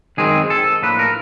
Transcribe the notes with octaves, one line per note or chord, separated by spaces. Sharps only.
F#2 D#3 G#3 C4 G#4
A4
A2 F3 A#3 D4 B4
A#4